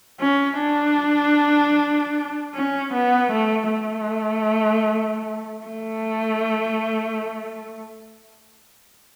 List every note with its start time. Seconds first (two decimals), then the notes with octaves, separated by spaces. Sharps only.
0.21 C#4
0.60 D4
2.54 C#4
2.93 B3
3.31 A3
3.71 A3
5.65 A3